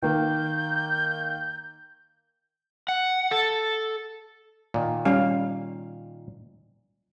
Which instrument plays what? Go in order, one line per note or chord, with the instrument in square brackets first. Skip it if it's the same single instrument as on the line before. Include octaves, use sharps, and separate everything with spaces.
[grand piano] D#3 A#3 [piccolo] G6
[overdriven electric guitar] F#5
A4
[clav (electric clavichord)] A#2 D#3
[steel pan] G3 C#4 F5